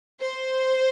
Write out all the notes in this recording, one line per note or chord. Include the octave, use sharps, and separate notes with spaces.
C5